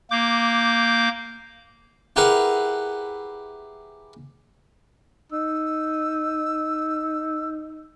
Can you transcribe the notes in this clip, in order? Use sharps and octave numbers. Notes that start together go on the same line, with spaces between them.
A#3 D6 G6
E4 G4 G#4 A#4 B4 F#5
D#4 E6